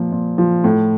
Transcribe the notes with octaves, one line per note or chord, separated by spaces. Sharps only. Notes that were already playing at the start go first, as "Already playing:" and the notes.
Already playing: A#2 F3
A#2
F3
A2